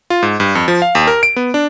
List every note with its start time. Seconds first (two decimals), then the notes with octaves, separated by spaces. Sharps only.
0.10 F4
0.23 G#2
0.40 G2
0.55 F2
0.68 F3
0.82 F5
0.95 D#2
1.07 A#4
1.23 D7
1.36 B3
1.54 D4